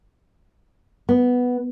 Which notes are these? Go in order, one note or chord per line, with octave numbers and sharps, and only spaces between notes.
B3